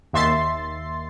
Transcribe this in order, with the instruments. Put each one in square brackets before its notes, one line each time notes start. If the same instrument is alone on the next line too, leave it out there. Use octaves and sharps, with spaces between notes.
[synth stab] D#2 E5 C6 A6 C7